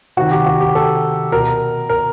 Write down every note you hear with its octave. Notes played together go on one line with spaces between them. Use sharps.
C3 D#3 F#4
G4
F#4
G4
A4
B2 A#4
A#4